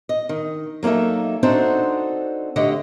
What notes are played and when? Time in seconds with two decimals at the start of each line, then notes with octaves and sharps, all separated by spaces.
0.09 D#5
0.29 D#3
0.83 F#3 A#3 D#4 A4 E5
1.43 C4 D4 D#4 F#4 A4 C5
2.56 D2 D3 G4 C#5 D#5